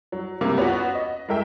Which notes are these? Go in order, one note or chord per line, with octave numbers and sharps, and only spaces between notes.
F#3
C#2 C3 A#3
B3 C#4 F4 F#4
D#5
G#3 E4 A#4 E5 G5